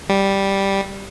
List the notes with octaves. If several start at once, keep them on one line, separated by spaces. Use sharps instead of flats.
G3